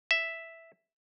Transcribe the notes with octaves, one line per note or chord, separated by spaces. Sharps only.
E5